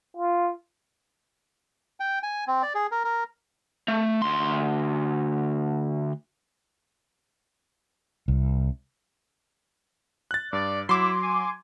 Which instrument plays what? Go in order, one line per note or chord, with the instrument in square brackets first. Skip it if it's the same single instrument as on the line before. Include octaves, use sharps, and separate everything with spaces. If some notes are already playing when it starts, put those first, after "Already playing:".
[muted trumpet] F4
[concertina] G5
G#5
C4
D5
G#4
A#4
A#4
[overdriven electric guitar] A3
D2 C6
[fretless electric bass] C2
[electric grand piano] F#6 A6
[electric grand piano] G2 [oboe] D5
[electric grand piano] F#3 [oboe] E4 [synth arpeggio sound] C6 D6
[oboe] G#5